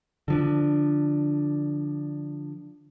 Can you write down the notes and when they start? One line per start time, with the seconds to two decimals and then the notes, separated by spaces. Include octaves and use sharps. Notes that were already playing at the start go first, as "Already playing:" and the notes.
0.28 D3 F3 D4